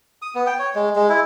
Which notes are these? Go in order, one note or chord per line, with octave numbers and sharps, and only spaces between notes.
D#6
B3
G5
C#5
G#3
G#3
E4